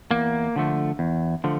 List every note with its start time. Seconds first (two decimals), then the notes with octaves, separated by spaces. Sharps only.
0.11 E2 A#3
0.56 D3 F3 A3
0.99 E2
1.44 D3 F3 A3